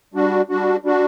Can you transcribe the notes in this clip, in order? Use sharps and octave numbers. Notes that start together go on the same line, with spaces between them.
G3 D4 F#4
G3 D4 F#4
G3 D4 F#4